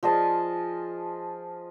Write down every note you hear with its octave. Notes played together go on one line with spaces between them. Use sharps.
F3 G#4 D#5 A5